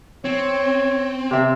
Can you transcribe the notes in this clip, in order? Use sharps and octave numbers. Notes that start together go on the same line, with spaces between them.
C4 C#5
C3 E5